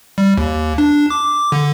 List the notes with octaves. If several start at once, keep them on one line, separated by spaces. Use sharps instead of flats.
G3
D#2
D4
D6
D3